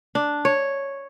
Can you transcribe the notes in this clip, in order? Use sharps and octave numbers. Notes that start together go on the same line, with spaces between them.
D4
C#5